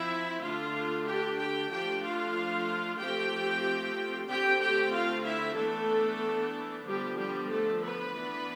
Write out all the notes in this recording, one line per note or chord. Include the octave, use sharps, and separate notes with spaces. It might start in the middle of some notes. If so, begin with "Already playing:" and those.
Already playing: F3 C4 E4 E5
D3 A3 D4 F4 F5
G4 G5
G4 G5
F3 A3 D4 G4 G5
F4 F5
F3 A3 C4 G4 G5
D3 A3 C4 G4 G5
G4 G5
F4 F5
E4 E5
E3 A3 B3 D4 A4
D3 F3 G3 B3 D4 G4
G3 G4
A3 A4
B3 B4
E3 B3 D4